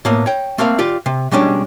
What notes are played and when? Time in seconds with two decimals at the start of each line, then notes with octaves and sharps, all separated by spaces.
0.05 A2 A#3 B3
0.26 C#5 G5
0.58 A3 A#3 C4 F5
0.79 F4 G4 D5
1.06 C3
1.31 B2 G3 G#3 C#4 D4